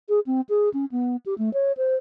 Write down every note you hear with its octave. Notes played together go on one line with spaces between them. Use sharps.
G#4
C4
G#4
C#4
B3
G4
A3
C#5
C5